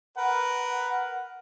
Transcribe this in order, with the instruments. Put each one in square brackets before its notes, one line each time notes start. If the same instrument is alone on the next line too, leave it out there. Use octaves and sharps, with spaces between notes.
[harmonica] A#4 B4 [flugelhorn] F#5